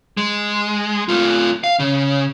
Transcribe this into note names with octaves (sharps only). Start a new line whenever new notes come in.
G#3
A3 F4
F5
C#3